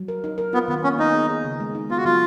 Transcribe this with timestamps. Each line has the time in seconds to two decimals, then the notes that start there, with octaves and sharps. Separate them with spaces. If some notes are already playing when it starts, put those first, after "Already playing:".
Already playing: F#3
0.08 A#4
0.24 D#4
0.38 A#4
0.53 B3 F4
0.68 D#3 B3
0.84 A#3 C#4
0.99 B3 D#4
1.15 G#4
1.30 G#4
1.44 C#3
1.60 G#3
1.75 D#4
1.90 B3 F4
1.97 F#4
2.05 F#3 F4